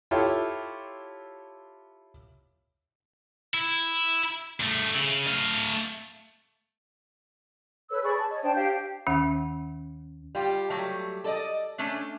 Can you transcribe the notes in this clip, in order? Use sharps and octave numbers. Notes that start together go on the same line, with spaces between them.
E4 F4 G4 A4 C#5
E4
G2 A3
C#3
A3 F5
A4 B4 C#5 E6
G#4 D5 B5 C#6
A5
C#5 D#5
D4 C5 G5 A5
G4 F5 G5 G6
D#2 D#3 C#4 F#5
G3 F4 G4
F#3 G3 A3
A4 D5 D#5
A3 C#4 D4